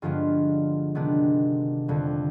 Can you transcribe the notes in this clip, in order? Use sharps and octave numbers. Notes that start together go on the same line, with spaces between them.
G2 D3 F3 G#3 B3 F4
C3 D#3 G#3 B3 D4
F2 D3 G3